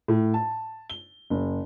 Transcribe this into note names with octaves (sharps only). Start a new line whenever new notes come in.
A2
A5
G7
F#1